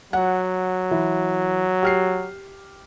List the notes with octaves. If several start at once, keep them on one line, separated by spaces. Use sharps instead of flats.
F#3 F#5
E3
G4 F6 C7